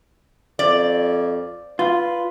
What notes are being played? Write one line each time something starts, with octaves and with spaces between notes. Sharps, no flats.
F2 D5
F4 B4